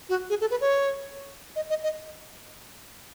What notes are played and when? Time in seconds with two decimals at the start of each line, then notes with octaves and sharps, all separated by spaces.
0.09 F#4
0.30 G#4
0.41 A4
0.51 B4
0.61 C#5
1.56 D#5
1.70 D#5
1.83 D#5